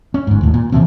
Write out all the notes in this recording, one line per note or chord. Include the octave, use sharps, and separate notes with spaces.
C#4
G1 G#2
D#2 A2
A#2
C3 E3 F3 C4